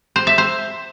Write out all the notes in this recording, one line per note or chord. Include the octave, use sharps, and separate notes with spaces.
C5
E5
C5